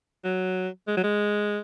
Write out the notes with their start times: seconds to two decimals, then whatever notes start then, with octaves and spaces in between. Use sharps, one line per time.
0.24 F#3
0.88 G#3
0.97 F#3
1.04 G#3